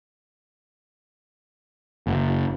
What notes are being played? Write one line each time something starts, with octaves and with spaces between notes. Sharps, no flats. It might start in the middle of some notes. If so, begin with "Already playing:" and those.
F#1